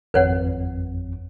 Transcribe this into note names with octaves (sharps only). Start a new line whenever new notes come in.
G#1 F2 B4 C#5 F#5